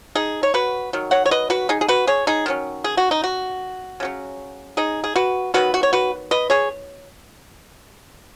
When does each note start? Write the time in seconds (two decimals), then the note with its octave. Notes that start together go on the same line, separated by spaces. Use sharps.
0.15 D#4 G#4
0.43 C#5
0.54 F#4 B4
0.93 D#3 F#3
1.11 C#5 F#5
1.26 C#5
1.31 B4 D#5
1.50 F#4 B4
1.69 D#4 G#4
1.81 G#4
1.88 F#4 B4
2.07 G#4 C#5
2.27 D#4 G#4
2.46 D#3 F#3 C#4
2.84 G#4
2.97 F#4
3.11 D#4
3.24 F#4
4.00 C#3 F#3 C#4
4.77 D#4 G#4
5.04 G#4
5.16 F#4 B4
5.54 D#3 F#3 B3 F#4 B4
5.74 F#4
5.83 C#5
5.93 F#4 B4
6.31 B4 D#5
6.50 G#4 C#5